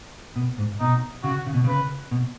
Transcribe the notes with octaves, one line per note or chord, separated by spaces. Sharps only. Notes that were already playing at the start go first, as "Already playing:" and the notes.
B2
G#2
B2 D#4
C#3 F#4
C#3
B2
C#3 B4
B2